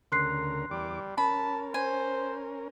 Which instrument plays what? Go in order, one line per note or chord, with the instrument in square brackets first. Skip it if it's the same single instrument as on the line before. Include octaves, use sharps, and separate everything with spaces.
[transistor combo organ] D2 C#3 A#4 [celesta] C6 F#6 C7
[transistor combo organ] E2 D6 [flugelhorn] G3
[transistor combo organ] C#4 A#4 [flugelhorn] A5 [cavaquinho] B5
[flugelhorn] C5 [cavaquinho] G#5